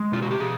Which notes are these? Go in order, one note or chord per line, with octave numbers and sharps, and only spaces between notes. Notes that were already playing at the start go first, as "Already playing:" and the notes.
Already playing: G#3
B2 F4
F#4
G4
B2 G#4